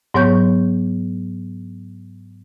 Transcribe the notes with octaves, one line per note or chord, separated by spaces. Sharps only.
G#2 F#3 B3 C#5 C#6 G6